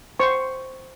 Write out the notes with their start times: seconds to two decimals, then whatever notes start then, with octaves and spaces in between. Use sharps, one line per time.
0.20 C5 C#6